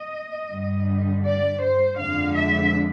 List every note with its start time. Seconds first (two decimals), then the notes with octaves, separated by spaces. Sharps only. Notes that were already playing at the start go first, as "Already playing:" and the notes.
Already playing: D#5
0.51 G2 D3 G3
1.24 D5
1.61 C5
1.98 F2 D3 F3 G#3 F5
2.34 E5